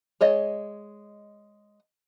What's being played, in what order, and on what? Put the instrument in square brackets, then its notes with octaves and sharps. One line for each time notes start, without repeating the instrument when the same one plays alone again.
[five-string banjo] G#3 C#5 D#5